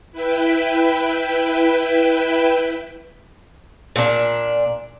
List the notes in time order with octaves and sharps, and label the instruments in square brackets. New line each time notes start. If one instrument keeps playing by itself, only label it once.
[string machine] E4 B4 E5 G5
[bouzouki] A#2 D4